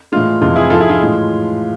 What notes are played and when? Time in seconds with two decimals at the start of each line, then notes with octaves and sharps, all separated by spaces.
0.12 A2 E3 G#3 F4
0.41 F2 C3 E3 G#3 F4
0.56 E4 G#4
0.70 G#2 F3 G#3 F4 A4
0.80 E4 G#4
0.89 F4
0.99 A2 E3 G#3